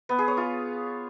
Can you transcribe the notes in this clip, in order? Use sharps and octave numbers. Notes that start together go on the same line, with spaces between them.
B3
G#4
C#5
F4